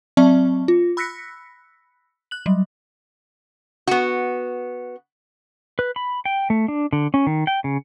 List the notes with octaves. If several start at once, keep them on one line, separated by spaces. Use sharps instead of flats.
F#3 C4 D5 E5 A5 C#6
F4
B5 E6 F#6 A#6 B6 C#7
F#6 F#7
F#3 G3
B3 F#4
B4
B5
G5
A3
D4
D3
C#4
D#3
G5
C#3